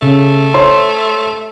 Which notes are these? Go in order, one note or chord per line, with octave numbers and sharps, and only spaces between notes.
C#3 A3
C5 C#5 C6